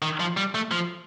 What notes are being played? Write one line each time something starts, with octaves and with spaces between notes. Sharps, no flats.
D#3
F3
G3
A3
F3